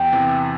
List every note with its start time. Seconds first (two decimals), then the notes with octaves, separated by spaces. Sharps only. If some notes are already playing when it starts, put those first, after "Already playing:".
Already playing: E2 G5
0.12 C3 E3